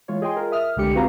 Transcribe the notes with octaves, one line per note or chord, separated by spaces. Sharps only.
E3 G#3 F4 C#5
G#4 D#5 G5 G#5 C6
F4 G#4 A#4
E5 D#6 F6
C2 D3 G#3 G4 C#7
C4 F4 F#4 B4 F5 A#5